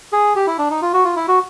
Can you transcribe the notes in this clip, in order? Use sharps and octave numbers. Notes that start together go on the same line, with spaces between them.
G#4
G4
E4
D4
D#4
F4
F#4
F4
E4
F#4